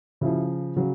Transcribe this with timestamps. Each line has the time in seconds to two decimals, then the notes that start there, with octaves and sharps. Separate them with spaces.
0.21 C#3 F3 E4 F#4
0.76 C#3 F#3